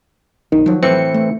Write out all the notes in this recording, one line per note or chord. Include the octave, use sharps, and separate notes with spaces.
A#1 D#3
F3 F#3
A2 E3 C4 C#7
A3